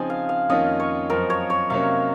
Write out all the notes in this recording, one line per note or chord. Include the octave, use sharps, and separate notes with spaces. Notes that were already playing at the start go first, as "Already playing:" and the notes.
Already playing: C#3 F3 C4 D#4 G#5
F5
F5
F2 D#3 A#3 C#4 F4 D#5
C#5
F#2 F3 C4 A#4
C#5
C#5
C3 F#3 A#3 C#4 F5